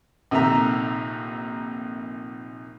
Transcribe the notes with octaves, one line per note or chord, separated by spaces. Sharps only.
A#1 C3 D#3 A3 E5 A#5